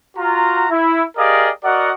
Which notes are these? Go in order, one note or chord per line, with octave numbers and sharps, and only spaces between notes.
F4 F#4 A#5
E4
G4 G#4 A#4 D5 D#5 F5
F#4 A#4 D5 D#5 F#5